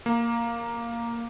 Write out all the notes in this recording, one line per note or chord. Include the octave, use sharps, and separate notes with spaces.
A#3